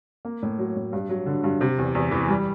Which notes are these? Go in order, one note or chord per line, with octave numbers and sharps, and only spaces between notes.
A#3
A2
F#3
A2
G2
F#3
D3
G2
C3
E2
E2
E3
G3